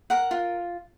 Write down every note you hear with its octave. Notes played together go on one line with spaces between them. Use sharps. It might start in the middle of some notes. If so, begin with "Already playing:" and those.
A#4 F#5
F4